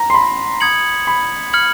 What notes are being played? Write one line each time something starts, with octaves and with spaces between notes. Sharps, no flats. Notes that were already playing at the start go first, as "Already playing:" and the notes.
Already playing: A#5
C6
B5
D#6 G#6 C#7 F#7
B5
F6 G#6 C#7 F#7